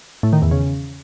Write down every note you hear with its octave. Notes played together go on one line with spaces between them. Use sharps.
A2
D#3
E2
C#3